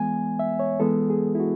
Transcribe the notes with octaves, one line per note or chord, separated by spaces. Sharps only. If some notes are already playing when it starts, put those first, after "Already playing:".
Already playing: E3 G#3 B3 G#5
E5
C#5
E3 G#3 B3 A4
G#4
E4
F#4